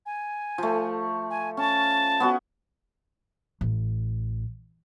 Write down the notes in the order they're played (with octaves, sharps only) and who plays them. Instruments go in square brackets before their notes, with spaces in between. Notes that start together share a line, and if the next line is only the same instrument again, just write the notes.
[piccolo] G#5
[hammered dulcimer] F3 A3
[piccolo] G#5
[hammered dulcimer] C#4 [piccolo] A5
[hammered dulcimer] B3 C#4 F#4
[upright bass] A1